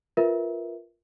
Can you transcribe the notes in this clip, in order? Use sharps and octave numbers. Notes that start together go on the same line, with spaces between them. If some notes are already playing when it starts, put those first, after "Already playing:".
F4 A#4 B4 E5